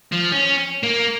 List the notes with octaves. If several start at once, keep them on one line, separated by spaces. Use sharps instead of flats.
F3
C#4
A#3